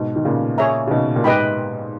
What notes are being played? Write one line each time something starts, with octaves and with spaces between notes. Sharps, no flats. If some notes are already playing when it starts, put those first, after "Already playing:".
Already playing: G#2 B2
D#3
A#2 C#3
G#4 C#5 E5 A#5
C#3
B2 D#3
A#2
G#2 G4 B4 D#5 G5 B5